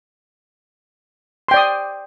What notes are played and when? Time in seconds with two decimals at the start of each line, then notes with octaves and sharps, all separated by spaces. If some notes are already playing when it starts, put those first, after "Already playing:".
1.48 C6
1.51 G5
1.54 D5
1.57 D#6